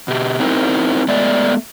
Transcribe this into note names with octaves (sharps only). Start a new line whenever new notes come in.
B2 G4
C4 D#4 E4 A#4 C5
G#3 A3 B3 D5 E5